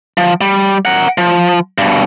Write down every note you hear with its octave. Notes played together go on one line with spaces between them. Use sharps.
F3
G3
A#4 F#5
F3
G2 B2